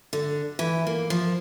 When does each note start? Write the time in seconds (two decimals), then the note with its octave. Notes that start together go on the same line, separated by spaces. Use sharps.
0.13 D3
0.59 E3
0.87 A#3
1.10 F3